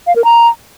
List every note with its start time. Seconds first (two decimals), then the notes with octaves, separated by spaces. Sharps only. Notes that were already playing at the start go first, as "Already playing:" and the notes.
0.07 F5
0.16 A#4
0.24 A#5